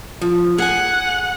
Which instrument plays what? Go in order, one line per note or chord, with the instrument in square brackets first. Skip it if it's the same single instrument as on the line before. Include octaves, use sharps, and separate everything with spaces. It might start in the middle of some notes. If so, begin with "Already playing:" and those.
[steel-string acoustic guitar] F3
[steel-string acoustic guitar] G#4 G#5 [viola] F#5